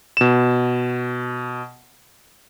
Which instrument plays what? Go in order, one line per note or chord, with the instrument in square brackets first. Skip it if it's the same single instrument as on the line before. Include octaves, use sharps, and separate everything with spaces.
[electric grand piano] B2 E7